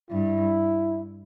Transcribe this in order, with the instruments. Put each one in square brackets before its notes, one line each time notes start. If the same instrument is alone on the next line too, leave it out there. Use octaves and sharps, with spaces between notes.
[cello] G2 [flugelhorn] E4